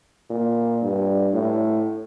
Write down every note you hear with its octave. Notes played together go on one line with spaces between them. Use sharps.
A#2
G2
A2